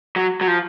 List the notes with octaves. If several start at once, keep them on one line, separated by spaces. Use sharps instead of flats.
F#3
F#3
F3